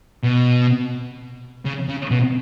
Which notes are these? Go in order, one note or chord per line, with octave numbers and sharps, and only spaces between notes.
B2
C#3
C#3
B2